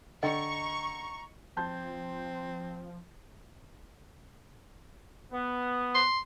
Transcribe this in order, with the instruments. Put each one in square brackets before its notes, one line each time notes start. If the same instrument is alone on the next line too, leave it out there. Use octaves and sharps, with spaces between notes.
[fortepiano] D3 [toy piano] D#5 G5 [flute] A#5 [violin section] C#6
[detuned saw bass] F3 [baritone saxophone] C4 [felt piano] A5 C6 G6
[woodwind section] B3
[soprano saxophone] C6